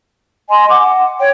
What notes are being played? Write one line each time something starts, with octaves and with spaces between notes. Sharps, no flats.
D#5 G#5 C6
F#5 D6
F#5
C#5 G5